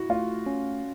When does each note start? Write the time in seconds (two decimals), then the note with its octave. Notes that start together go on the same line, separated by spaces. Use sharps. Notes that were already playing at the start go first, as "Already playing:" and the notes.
Already playing: E4 F#4
0.09 A3 F4
0.46 C#4